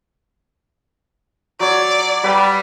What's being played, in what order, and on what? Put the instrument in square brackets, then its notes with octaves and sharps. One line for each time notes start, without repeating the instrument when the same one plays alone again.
[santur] F#3 C#5 [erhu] D5
[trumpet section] G3 [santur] B4